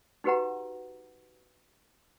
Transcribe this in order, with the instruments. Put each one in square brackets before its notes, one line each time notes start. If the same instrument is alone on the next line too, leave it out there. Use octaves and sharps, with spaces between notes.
[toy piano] D#4 F#4 G4 B4 F#5 A#5